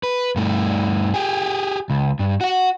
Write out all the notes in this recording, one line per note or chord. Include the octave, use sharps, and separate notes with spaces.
B4
G2 A3
G4 G#4
C#2
G2
F#4 F#5